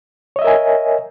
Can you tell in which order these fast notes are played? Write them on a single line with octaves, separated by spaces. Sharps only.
C#5 D#5 E5 A#4 G#5